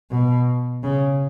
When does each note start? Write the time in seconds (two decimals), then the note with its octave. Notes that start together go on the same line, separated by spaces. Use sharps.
0.11 B2
0.83 C#3